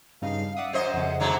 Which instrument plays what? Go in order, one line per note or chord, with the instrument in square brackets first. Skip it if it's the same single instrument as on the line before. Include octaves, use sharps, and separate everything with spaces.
[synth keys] G2 C#3 D#4 [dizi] F5
[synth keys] D5 E5 D#6 [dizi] F#5
[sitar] F#2 C5 D#5
[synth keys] F2 C#3 [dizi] F#5
[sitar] G#2 F#3 A3 [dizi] A#5